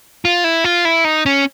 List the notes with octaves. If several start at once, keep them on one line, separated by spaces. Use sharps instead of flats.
F4
E4
F4
E4
D#4
C#4